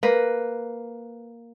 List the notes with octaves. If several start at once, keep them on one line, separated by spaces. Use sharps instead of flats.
A#3 B4